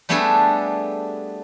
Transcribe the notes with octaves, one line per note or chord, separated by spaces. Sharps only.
G3 A3 B3 D4 G#4 A4